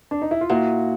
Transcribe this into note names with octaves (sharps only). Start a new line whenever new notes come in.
D4
D#4
E4
F4
A#2 E4 F#4